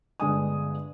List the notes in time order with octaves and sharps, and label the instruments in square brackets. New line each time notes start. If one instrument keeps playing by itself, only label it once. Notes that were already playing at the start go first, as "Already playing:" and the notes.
[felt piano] G1 D3 G#3 G#5 D#6